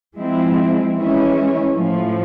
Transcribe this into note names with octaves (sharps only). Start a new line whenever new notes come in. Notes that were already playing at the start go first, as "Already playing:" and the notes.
F3 G#3 C4 E4
E3 G#3 C#4 E4
A2 F3 A3